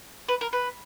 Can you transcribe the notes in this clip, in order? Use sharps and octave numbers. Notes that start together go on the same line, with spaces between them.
B4
A#4
B4